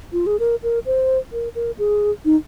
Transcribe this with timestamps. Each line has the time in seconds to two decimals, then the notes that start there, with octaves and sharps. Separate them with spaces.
0.13 F4
0.26 G#4
0.39 A#4
0.63 A#4
0.86 C5
1.32 A#4
1.55 A#4
1.79 G#4
2.25 D#4